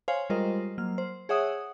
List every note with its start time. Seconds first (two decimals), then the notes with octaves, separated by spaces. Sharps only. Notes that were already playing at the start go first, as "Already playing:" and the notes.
0.08 C5 C#5 F5 G#5
0.30 G3 G#3 F4 A#4 C5 D#5
0.78 F#3 A#3 F6
0.98 C5
1.29 G#4 C#5 E5 F#5 D#6